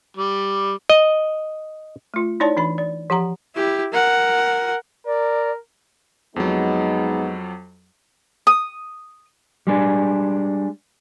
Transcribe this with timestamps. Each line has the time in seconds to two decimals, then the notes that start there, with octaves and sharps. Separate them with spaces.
0.17 G3
0.90 D#5
2.14 A3 F4
2.40 D#4 E4 C#5 D5 A5
2.57 E3 D4 B5
2.78 D5
3.10 F3 G4 F#5 A#5
3.55 E4 G4
3.93 A#4 F#5
5.06 A#4 D5
6.36 F2 F#3 G#3 B3 D#4
8.47 D#6
9.67 G3 G#3 D4